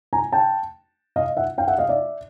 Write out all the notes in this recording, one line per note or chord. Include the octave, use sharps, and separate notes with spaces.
G#5 A#5
G5 A5
D#5 F5
E5 F#5
F5 G5
E5 F#5
D#5 F5
D5 E5